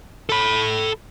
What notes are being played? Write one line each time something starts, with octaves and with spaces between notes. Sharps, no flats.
A4 B5